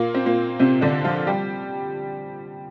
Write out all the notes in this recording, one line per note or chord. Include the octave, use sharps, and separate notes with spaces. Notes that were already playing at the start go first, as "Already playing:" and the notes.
Already playing: A#2 A#3
C4
A#2 A#3
C3 C4
D3 D4
F3 F4
G3 G4